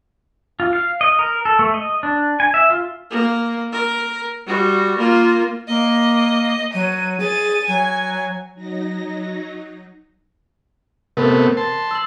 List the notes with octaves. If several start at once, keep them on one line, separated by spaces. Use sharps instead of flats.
F4
F5
D#5
A#4
A4
A3
D#5
D4
G#5
E5
F4
A#3
A#4
G3 F#4
A#3 F4
A#3 D#5
F#3 D#7
G#4 A6 D#7
F#3 G#5
F#3 D#4 A#6
C3 A3 B3 A#4
A5 C6
E6 F#7